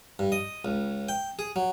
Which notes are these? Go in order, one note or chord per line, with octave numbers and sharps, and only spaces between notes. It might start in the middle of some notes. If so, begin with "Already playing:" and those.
G2
D#5
C#2
G5
G#4
F#3